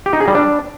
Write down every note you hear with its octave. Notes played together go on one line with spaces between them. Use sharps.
G4
D#4
G#4
G3
D4